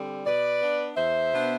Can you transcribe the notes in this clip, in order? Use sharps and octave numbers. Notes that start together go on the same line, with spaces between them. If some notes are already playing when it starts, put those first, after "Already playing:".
Already playing: D3 G3 C4
B2 B4 D5
B3 D4
E2 C5 E5
B2 B3 D4